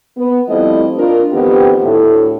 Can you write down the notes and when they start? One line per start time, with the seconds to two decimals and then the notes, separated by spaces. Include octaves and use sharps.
0.17 B3
0.49 F3 G3 A3 C4 E4 D#5
0.98 D4 F4 A#4
1.32 F2 D#3 B3 C4 G4
1.82 D2 A2 A3